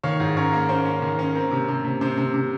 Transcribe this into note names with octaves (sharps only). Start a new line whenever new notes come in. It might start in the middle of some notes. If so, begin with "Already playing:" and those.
D#3 C#5 F5
G#2
C#4 A#4 C#5
A#3
C#4 C5
C#4
D#3
C#4
C4 A#4
C3
C3
C3
C3 C5
C3
C3